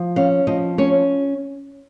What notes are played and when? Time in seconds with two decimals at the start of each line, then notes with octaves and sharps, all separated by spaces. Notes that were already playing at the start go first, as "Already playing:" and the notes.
Already playing: F3
0.16 C#4 F5
0.47 F3 D#5
0.78 C#4 C#5